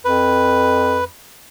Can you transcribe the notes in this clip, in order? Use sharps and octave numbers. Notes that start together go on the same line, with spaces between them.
F2 B4